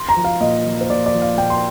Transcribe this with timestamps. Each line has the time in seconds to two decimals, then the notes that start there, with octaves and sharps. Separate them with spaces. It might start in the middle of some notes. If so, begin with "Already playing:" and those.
Already playing: C6
0.09 A#5
0.17 F3
0.25 F5
0.41 A#2 D#5
0.66 F3
0.81 C5
0.90 A#2 D5
1.06 D5
1.14 F3
1.22 F5
1.37 A#2 G5
1.50 C6